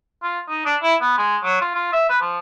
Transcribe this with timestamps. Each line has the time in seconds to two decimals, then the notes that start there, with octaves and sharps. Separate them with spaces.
0.23 F4
0.48 D#4
0.66 D4
0.83 E4
1.01 B3
1.17 G#3
1.43 F#3
1.61 F4
1.75 F4
1.93 E5
2.10 B4
2.21 F3